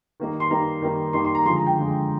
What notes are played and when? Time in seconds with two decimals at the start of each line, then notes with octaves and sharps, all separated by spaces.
0.20 D#3 G3 A#3 D#4
0.40 C6
0.50 D#3 G3 A#3 D#4 A#5
0.82 D#3 G3 A#3 D#4
1.13 D#3 G3 A#3 D#4 C6
1.25 C6
1.35 A#5
1.45 D3 F3 G#3 C6
1.56 A#5
1.66 G5
1.76 D3 F3 G#3